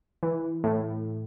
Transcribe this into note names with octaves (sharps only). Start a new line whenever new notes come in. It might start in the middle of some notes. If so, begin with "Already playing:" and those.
E3
A2